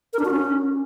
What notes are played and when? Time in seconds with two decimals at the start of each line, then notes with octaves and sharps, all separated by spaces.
0.13 A#4
0.19 D4
0.25 F#4
0.31 C#4